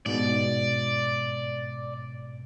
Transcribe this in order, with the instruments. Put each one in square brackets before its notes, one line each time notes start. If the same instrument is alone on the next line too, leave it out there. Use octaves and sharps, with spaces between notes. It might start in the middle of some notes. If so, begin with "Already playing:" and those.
[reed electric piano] G#2 B2 [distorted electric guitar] D5